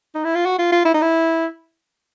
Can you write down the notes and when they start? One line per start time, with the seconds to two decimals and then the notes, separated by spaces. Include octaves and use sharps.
0.15 D#4
0.24 E4
0.35 F4
0.45 F#4
0.58 F4
0.72 F4
0.85 E4
0.94 D#4
1.02 E4